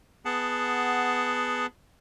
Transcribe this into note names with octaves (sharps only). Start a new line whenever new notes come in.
B3 G#4 F#5 A5